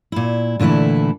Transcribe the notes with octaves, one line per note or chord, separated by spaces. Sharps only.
A#2 E4
A#2 D3 E3 A3 E4